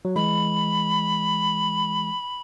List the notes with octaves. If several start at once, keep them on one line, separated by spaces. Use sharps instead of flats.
F#3
E3 G#3 B5